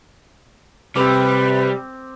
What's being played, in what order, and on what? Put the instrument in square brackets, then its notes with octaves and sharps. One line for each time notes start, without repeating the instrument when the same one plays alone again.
[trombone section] C3 [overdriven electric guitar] G3 [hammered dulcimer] C4 D6 [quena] B4